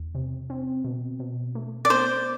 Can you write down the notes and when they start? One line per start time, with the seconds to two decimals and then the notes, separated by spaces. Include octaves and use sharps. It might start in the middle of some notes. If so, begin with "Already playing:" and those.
Already playing: E2
0.15 C3
0.50 C4
0.84 B2
1.20 B2
1.55 A3
1.85 D5
1.90 B3 C5